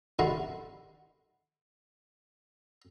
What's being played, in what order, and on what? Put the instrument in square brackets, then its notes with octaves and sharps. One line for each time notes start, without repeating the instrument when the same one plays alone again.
[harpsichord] D3 D#3 E4 F#4 F#5 C6